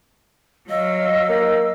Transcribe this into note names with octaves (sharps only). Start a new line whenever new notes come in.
F#3 D#5 F5 E6
A#3